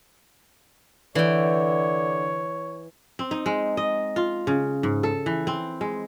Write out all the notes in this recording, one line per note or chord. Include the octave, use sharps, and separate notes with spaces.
D3 E3 C#5 G5
C4
D#4
G#3
D#5
F4
C#3
G#2
A4
E3
C4
G#3